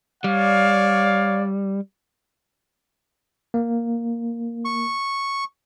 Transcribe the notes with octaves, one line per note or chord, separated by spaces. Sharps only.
G3 C#5 D5 F5
A#3
C#6